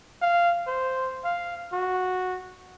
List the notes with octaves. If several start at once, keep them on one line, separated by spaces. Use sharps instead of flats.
F5
C5
F5
F#4